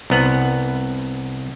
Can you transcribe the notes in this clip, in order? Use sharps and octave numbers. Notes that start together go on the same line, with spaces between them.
C2 B3 F#5